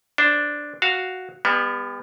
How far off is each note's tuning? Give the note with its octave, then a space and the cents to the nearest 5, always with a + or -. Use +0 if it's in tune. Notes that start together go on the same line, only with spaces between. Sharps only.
D4 +0 C5 +10
F#4 +0 F5 +0
G3 +40 B3 +0